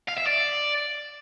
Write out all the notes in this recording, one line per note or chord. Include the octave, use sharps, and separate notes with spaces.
F5
E5
D5